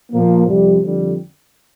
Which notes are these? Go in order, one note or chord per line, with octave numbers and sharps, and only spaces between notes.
A#2 F3 A#3
F2 C3 G3
F2 D3 G3